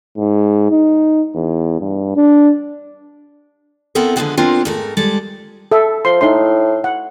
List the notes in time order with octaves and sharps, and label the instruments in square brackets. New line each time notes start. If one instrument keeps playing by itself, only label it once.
[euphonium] G#2
D#4
E2
G2
D4
[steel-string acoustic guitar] B3 C4 E4 A4 A#4
D3 F3 F#3 G#3 C4 B4
B3 C4 D4 F4 A#4
G#2 A3 A#4
G3 G#3 A4
[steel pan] A4 E5
[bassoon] F3 [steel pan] C6
[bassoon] A2 [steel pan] D#4 E4 C6
[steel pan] F#5